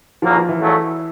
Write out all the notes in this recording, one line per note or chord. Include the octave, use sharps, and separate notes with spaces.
E2 B2 F3 F#3 A#3
F3
E3
E2 C#3 F#3 A3